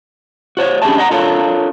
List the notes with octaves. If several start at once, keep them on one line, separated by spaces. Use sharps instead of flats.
F#4 C5 C#5
C#4 D4 G4 G#4 E5 A5
D#5 F#5 A#5
D4 F4 A4 A#4 C#5 F5